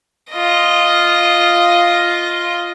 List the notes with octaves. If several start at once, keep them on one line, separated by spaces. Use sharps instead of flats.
F4 D#5